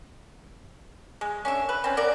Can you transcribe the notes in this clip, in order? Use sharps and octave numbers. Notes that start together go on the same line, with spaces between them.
G#3
C#4 D4 E5
B4
C4 C#4
B3 A#4 D5